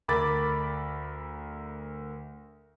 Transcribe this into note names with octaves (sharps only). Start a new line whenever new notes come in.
D2 A#4 B5 D6 A6